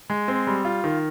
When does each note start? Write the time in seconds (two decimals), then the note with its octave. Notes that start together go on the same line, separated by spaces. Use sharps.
0.10 G#3
0.28 C4
0.47 G3
0.65 F4
0.84 D#3